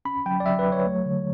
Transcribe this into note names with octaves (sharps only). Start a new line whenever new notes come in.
C#4 B5
F#3 G5
D5
F#3 E5
B4
F#3
C#5
A3
D3